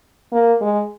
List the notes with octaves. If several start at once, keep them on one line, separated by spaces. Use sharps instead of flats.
A#3
G#3